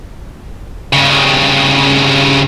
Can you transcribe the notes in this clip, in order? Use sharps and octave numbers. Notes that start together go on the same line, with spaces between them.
G2 C#3